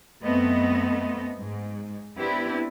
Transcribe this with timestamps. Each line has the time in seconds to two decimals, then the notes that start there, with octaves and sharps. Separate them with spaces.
0.23 F#2 A3 B3 C4 D#5
1.38 G#2
2.16 B3 C4 D4 E4 G4 B4